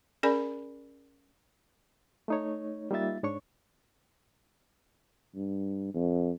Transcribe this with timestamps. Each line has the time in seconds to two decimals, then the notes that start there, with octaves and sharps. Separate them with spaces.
0.23 C#4 G#4 A#4 D5 G#5 B5
2.28 A3 D#4 C#5
2.91 G3 A#3 D#4 F4 E5 A6
3.23 G#2 D4 C#5 C#6
5.35 G2
5.94 F2